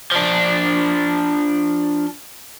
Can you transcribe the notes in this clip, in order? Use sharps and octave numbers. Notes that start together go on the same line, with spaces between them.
F3 D4